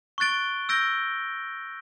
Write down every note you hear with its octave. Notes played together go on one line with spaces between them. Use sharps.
C#6 F#6 A6 D7 G7
E6 G6 A#6 D7 G7